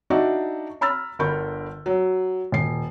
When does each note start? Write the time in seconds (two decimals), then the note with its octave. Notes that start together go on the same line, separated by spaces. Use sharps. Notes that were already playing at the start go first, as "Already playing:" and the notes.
0.10 D4 D#4 F#4 D5 E5
0.81 A#5 B5 E6 F6 A6
1.19 G1 D3 A#4 B5 C#6 G6
1.86 F#3
2.52 D#1 C7